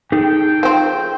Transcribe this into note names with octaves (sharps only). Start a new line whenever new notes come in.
D#4 G#4 A4 G5
F3 C4